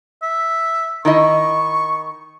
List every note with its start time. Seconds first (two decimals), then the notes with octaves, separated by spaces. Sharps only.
0.22 E5
1.05 D#3 E4 D#5 C#6